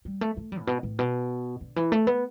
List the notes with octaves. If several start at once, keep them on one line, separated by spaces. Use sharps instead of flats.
G3
A3
A3
G3
A2
B2
A2
B2
D3
E3
A3
B3